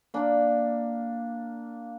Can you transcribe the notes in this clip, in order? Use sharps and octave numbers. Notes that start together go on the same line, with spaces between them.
A#3 D4